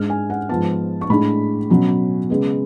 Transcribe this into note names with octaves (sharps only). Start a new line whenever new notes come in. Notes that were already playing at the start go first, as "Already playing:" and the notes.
Already playing: G#2 G#3 D4 F6
G#5
F#5
G#2 F3 B3 A5
C#6
A2 G#3 D4 B5
B2 F#3 C#4
C#3 G#3 B3